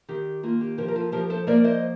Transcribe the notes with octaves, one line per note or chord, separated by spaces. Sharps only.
D#3 G4
A#3 F4
G4
F3 G4 A#4
A#4
F4 A4
F3 G4 A#4
A4 C5
A#3 A#4 D5
C5 D#5